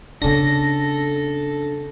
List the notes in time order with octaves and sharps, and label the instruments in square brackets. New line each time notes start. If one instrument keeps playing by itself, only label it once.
[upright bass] C#3 B3 [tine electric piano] C#4 D4 [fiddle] A4 [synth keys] A#6